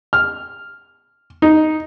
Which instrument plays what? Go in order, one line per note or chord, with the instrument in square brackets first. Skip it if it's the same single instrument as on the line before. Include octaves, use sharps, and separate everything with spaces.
[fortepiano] F6
D#4